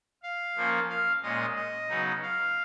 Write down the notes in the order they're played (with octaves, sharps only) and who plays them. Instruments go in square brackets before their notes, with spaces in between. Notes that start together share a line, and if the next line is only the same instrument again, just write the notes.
[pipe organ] F5
F3 A#3 C#4
F5
A#2 G#3 C#4 D#5
D#5
C#3 F#3 B3 D#4
F5